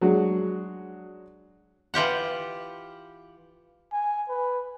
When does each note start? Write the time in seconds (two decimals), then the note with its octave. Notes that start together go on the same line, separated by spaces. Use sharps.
0.01 F#3 G#3 D4 F#4
1.94 E3 F4 G4 F#5
3.93 G#5
4.29 B4